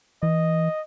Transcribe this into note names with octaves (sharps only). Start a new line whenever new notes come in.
E3 D#5